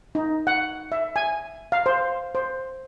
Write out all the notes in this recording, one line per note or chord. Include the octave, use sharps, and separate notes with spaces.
D#4
F#5
E5
G#5
F5
C5
C5